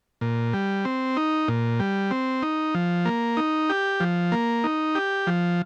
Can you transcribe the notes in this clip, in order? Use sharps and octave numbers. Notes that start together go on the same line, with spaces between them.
A#2
G3
C4
D#4
A#2
G3
C4
D#4
F3
A#3
D#4
G4
F3
A#3
D#4
G4
F3